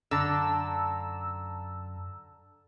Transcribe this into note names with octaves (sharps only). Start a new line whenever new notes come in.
F#2 D3 A5 A#5 E6